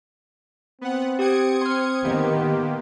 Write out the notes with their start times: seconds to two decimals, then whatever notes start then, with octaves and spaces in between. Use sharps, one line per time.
0.81 B3 C4 F#5
1.19 G4 C5 G5 D#6 G#6 C#7
1.62 C6 F6
2.04 D#3 A#3 B3 G4